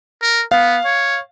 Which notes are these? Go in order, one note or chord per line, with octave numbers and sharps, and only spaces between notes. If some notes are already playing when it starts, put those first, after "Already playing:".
A#4
B3 F5
C#5